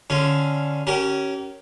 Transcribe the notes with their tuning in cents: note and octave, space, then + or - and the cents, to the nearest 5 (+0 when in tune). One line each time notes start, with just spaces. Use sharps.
D3 +0 C#4 +0 F4 +0
C#4 +0 G4 -40 A#4 +0